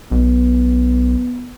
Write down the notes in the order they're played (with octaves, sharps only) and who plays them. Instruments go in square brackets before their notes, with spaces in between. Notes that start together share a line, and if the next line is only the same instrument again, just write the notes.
[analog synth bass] B1 [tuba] B3